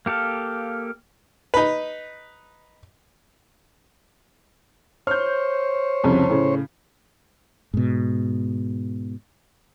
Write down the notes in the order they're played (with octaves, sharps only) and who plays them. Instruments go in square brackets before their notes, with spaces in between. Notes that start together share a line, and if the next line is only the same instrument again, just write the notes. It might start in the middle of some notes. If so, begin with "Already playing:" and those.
[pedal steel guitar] A#3 G4 A4 F5
[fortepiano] D#4 B4
[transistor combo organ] C5 C#5 [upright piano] F6 G6
[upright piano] C2 F2 C#3
A2 C#3
[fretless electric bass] G#2 B2